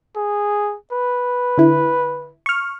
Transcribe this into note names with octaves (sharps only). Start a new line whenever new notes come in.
G#4
B4
D3 E4
C#6 F6